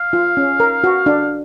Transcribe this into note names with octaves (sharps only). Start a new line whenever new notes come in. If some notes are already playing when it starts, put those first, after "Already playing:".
Already playing: F5
F4
C#4
A#4
F#4
D4